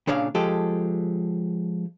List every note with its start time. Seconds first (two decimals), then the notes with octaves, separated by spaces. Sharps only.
0.07 A#2 C#3 D4 C#5 F5
0.35 F3 G#3 G4 A4